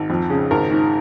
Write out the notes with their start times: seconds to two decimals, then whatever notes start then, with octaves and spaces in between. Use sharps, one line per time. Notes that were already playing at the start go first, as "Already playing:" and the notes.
Already playing: G#1
0.10 F2
0.30 C#3
0.51 G#1 A#4
0.71 G#2